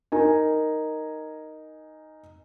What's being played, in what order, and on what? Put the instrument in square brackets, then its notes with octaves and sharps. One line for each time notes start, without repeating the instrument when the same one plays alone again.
[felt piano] D#4 A#4 G#5